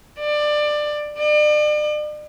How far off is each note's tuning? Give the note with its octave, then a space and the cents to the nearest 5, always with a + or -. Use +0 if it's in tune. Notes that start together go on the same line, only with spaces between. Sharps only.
D5 +20
D5 +40